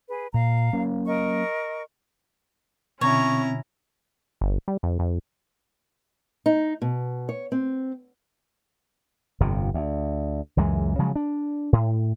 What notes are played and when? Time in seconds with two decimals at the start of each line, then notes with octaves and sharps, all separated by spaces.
0.09 G#4 B4
0.34 A#2 F5 A#5
0.73 F#3 A#3 C#4
1.07 A#4 D#5 C#6
3.01 B2 D3 C4 C#4 E4 C#5 A#5
4.41 G1
4.68 G3
4.83 F2
4.99 F2
6.46 D#4
6.82 B2
7.29 C#5
7.52 C4
9.40 G1 F2 C3
9.74 D2
10.57 C#2 F#2 E3 G#3
10.99 C#3 F3 F#3 G#3
11.16 D4
11.73 A2